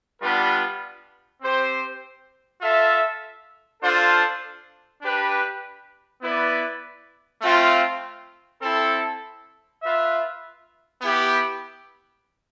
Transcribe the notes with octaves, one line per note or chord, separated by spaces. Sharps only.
G3 B3 D4 F4 B4
C4 G4 C5
F4 A4 E5
D4 F4 A4 C5 F5
D4 G4 B4
B3 E4 B4 D5
A3 C4 F4
C4 E4 A4
F4 B4 E5
B3 E4 G4